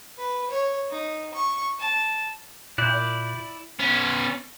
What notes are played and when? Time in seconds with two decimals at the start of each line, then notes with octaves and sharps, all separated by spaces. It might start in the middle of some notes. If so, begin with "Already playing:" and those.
0.18 B4
0.50 C#5
0.91 D#4
1.34 C#6
1.80 A5
2.78 A#2 E4 D5 F#6 G6
3.79 B3 C#4